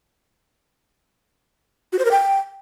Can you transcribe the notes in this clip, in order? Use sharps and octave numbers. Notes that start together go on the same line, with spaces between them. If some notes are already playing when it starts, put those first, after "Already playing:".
F#4
C5
A#4
G5